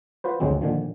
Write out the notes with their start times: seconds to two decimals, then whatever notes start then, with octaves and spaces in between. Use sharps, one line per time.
0.24 F4 F#4 B4 C5
0.40 G1 D2 F#3 G#3 C4
0.61 A#2 D3 D#3 F3